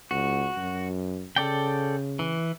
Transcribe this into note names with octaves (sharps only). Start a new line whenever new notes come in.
C#2 F#4
F#2
C#3 A4 D5 G5
E3